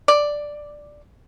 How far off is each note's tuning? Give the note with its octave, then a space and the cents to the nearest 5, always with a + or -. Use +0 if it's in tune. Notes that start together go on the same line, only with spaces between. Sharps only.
D5 +5